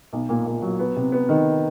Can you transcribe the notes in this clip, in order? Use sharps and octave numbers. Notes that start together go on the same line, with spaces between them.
B1
A#2
A#2
F#3
B3
C3
B3
D#3